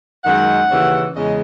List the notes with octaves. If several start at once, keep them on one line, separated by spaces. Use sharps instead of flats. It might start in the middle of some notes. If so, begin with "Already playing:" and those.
F#2 D#3 G#3 F#5
D#2 C#3 E3
E2 C#3 G#3 D#5